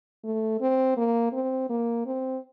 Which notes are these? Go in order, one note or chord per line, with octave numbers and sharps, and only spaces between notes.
A3
C4
A#3
C4
A#3
C4